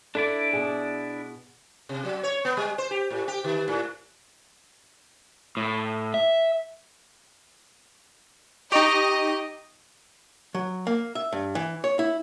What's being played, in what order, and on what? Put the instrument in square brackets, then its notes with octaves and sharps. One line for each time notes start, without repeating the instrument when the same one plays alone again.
[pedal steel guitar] D4 E4 D5 [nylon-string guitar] A4
[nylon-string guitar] B2 G#4
[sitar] C3
F#3
C#5
B3
G3
C5
G4
A2
G4
D#3
A2
[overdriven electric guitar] A2
E5
[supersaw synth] D#4 G4 [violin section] D#5 [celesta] C#6 D7 F7
[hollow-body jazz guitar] F#3
A#3
E5
G2
E3
C#5
E4